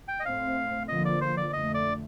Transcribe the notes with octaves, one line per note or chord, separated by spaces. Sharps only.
G5
D#5
A2 A3 C4 F5
D3 F3 A#3 D#5
D5
C5
D5
F2 D3 A3 D#5
D5